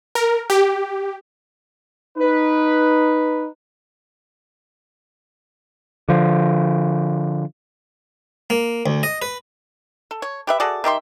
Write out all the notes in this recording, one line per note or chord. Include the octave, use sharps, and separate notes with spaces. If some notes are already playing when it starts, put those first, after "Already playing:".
A#4
G4
D#4 B4
D3 F3
A#3
D2
D#5
B4
A4
C#5
G4 B4 E5
F#4 G#4 A4 D5
D#3 G4 E5 C6